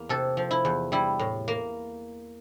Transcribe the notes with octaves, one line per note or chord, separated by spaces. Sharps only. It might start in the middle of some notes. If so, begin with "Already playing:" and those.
Already playing: E2 A#3
C3 A4
F3
E4
E2
G3 E4
A2
A#3